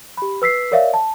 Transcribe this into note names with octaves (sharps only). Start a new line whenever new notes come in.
G4 B5
B4 E6 B6 C7
A#4 C#5 D5 E5 F5
A5